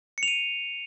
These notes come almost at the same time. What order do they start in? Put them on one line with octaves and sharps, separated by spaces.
C#7 F7 D#7